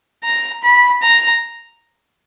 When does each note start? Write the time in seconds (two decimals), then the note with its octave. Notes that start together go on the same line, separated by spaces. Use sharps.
0.24 A#5
0.63 B5
1.03 A#5